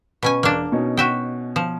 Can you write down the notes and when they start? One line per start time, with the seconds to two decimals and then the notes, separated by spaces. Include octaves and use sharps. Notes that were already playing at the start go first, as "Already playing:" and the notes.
0.23 B2 C#4 G#5
0.43 E1 A#3 D4
0.72 B2 C#4 D#4
0.97 F#4 E5 G5
1.56 F3